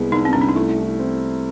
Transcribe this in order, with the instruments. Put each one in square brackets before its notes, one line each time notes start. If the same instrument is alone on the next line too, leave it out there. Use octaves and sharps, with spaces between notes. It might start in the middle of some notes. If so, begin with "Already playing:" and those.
Already playing: [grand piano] C2 G#3 B3
[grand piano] C2 [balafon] D#4
[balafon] C4
[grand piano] C2 [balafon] C#4
[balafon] D4
D#4
[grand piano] A3 [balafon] E4
[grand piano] A3
C4